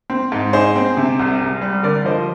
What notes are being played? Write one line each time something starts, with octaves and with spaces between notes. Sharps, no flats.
C4
G#2
D#4 G#4 C5
C4
C3
C2
C2
G3
D3 A#4 D5
F3 C5 D#5